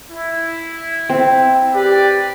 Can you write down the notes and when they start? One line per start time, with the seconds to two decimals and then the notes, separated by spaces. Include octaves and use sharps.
0.12 E4
1.09 C4
1.75 G4 B4 D5